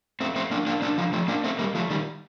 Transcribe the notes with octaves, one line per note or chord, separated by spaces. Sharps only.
A3 C4
A3 C4
A#3 D4
A#3 D4
A#3 D4
D3 F3
F3 A3
A#3 D4
A3 C4
G3 A#3
F3 A3
D#3 G3